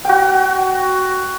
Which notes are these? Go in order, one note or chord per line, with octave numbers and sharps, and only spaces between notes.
F#4 G5